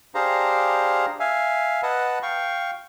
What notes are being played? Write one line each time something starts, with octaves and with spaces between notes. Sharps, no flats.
D4 G4 G#4 C5 F5 A#5
E5 F5 G#5
B4 D#5 F#5 A5
F5 G5 C#6